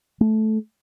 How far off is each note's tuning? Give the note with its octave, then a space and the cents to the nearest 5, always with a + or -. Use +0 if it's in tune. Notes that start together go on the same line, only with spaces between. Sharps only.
A3 -15